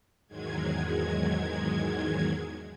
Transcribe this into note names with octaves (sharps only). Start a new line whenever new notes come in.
E2 G#2 D#3 F#3 G#3 G#6